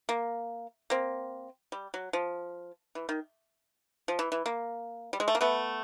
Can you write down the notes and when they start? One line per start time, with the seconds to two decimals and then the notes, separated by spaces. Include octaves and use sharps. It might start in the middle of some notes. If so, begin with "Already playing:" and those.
0.09 A#3
0.90 A#3 C4
1.72 G3
1.94 F#3
2.13 F3
2.95 E3
3.09 D#3
4.08 F3
4.19 E3
4.32 E3
4.46 A#3
5.13 G3
5.20 G#3
5.28 A3
5.35 A#3
5.41 A3 B3